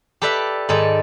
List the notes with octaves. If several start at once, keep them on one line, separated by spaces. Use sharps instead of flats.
G4 A4 B4 D5 E5
G#2 D#3 A4 D5